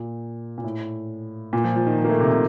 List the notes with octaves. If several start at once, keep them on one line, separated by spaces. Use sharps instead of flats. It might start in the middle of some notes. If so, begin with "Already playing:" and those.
Already playing: A#2
A#2
A2
A#2
F3
F3
D#3
F3
A#3
A3
C3
C3